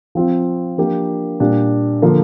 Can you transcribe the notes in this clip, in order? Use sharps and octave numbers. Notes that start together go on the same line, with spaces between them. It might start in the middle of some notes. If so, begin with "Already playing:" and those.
F3 C4 F4
F3 A#3 D4 G4
A#2 G3 D4 G4
D3 F3 A#3